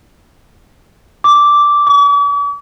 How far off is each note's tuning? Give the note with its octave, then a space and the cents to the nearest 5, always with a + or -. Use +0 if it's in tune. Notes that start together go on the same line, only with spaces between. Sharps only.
D6 -5
D6 -45